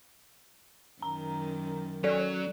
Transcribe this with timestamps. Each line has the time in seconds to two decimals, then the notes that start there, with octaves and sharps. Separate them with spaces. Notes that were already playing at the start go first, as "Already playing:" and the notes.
1.02 F#2 D#3 A#5
2.04 F#3 C#4 A4 D5